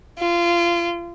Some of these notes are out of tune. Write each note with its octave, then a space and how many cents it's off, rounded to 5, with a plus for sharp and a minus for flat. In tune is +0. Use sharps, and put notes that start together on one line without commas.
F4 -25